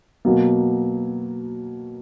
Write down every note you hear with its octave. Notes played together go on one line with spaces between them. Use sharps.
B2 F#3 A#3